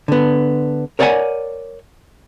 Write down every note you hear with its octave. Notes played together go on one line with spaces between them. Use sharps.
D3 B3
A#4 C#5 D5 E5 F#5 G#5